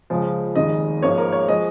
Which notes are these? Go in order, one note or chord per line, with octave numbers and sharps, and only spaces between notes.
C#2 C#3 F3 G#3
F1 D#2 D#3 G#3 D#5
G#1 G#2 F3 A#3 C#5
A#4
C#5
F3 G#3 D#5